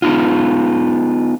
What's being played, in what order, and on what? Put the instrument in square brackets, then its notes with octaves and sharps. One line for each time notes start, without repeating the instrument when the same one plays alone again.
[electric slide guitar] B3 D#4 F4